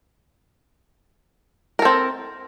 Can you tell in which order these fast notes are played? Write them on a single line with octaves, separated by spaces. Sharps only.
A#4 A4 C4